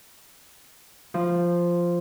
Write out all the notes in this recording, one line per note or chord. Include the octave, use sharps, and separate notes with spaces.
F3